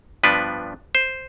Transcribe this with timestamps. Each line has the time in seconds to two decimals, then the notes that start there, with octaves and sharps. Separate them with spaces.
0.23 G2 F3 B3 D4 B4
0.95 C5